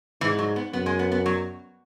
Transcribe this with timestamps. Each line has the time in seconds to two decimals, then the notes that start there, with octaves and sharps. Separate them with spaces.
0.21 G#2 E3
0.39 F#3
0.56 B3
0.73 F#2 B3
0.86 G#3
0.99 B3
1.12 B3
1.26 F#3